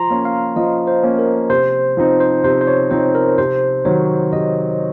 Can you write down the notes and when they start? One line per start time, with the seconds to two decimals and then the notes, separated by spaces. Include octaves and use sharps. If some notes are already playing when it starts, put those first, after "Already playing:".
Already playing: F3 A#5 C6
0.10 A#3 C#4
0.25 F5
0.56 F3 D#5
0.87 C5
1.03 A#3 C#4
1.19 A#4
1.50 C3 C5
1.97 F3 C4 D#4
2.20 C5
2.44 C3 C5
2.61 C5
2.67 C#5
2.91 F3 C4 D#4 C5
3.15 A#4
3.38 C3 C5
3.85 D#3 F#3 C#5
4.32 C3 D#5